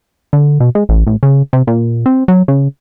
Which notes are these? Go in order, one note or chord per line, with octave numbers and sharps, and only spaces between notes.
D3
B2
G#3
A1
A1
C#3
C3
A#2
C4
F#3
C#3